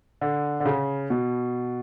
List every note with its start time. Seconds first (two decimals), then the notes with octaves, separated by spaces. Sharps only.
0.21 D3
0.60 D3
0.65 C#3
1.10 B2